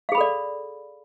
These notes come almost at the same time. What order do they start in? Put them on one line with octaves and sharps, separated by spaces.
F5 G#4 B5 A4 D5